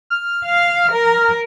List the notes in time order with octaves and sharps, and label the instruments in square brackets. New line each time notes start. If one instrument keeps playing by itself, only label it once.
[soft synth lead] F6
[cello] F5
A#4